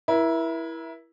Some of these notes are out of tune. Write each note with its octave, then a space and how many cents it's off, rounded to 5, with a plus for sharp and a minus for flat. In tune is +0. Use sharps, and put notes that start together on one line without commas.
E4 +0 A#4 +40